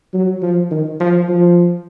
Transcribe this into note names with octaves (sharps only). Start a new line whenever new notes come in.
F#3
F3
D#3
F3
F3